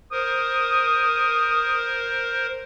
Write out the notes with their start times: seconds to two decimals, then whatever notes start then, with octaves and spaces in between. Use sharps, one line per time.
0.12 A#4 C5 D#6